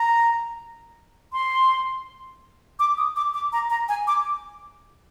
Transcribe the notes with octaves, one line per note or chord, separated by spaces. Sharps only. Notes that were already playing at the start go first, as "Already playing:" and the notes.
Already playing: A#5
C6
D6
D#6
D6
D6
A#5
A#5
G#5
D6